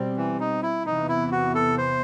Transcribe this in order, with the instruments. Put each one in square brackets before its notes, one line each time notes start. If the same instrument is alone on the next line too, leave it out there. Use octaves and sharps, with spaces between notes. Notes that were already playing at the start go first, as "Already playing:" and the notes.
Already playing: [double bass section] B2 G3 C4
[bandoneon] E3
D#4
E4
[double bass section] E2 C3 E3 B3 [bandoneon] D#4
[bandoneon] E4
F#4
A4
C5